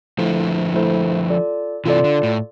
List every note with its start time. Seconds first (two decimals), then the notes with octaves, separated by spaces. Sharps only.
0.18 D3 F3 A3 E4 A4 C5
0.74 A3 E4 A4 C5
1.30 F4 A4 D5
1.86 C3 E3 F4 A4 D5
2.04 D3
2.23 A2